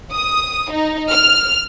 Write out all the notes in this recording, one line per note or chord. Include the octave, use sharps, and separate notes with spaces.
D#6
D#4
F6